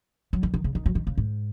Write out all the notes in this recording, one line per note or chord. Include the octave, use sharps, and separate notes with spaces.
F#3
D#3
D#3
C#3
D#3
F#3
D#3
C#3
G#2